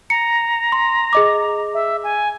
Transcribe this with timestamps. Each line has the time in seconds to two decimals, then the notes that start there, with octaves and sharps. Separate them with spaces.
0.10 A#5 C#7
0.72 C6
1.13 G#4 D#5 D6
1.74 E5
2.04 G#5